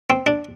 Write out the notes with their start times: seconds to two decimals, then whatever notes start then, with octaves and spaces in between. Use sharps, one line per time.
0.10 C4
0.26 D4